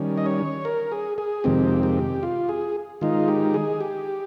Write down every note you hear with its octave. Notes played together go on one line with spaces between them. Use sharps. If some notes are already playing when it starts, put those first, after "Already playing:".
Already playing: D#3 G3 C#4
D#5
C#5
A#4
G#4
G#4
F2 C3 D#3 G#3 C4 G4
G4
F4
G#4
D#3 G#3 D#4 F4
G4
G#4
G4